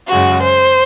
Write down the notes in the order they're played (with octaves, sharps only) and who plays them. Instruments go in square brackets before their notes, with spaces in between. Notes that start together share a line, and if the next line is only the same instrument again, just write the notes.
[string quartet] F#2 C#3 G#3 F#4
C5